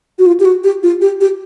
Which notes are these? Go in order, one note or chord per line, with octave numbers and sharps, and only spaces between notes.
F#4
F4
G4
F#4
G4
F4
G4
G4